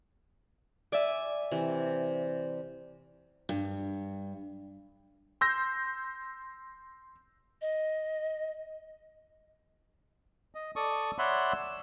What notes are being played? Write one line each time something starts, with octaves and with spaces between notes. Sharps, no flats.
D5 E5 G#5
C3 E3
G2
C6 E6 G6 A#6
D#5
D#5
A4 D5 C#6 D#6
C#5 D5 E5 F#5 B5 C6
E6